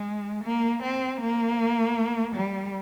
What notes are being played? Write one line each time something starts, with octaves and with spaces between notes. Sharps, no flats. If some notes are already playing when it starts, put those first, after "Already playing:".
Already playing: G#3
A#3
C4
A#3
G3